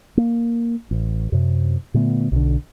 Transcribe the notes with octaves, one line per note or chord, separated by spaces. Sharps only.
A#3
A1
F#2 C3
A#2 D3 A3 B3
B1 D3